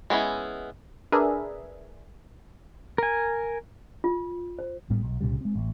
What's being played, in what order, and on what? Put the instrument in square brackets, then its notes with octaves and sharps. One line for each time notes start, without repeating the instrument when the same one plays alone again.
[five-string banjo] G#3 B3 C#4 E4
[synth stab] D4 G#4 A#4 B4 E5
[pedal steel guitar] A#4 G#5
[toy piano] F4
C5
[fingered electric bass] G#1 A2 G3 B3
B1
C2 A#2 C#3 G3
G#3 C4
A1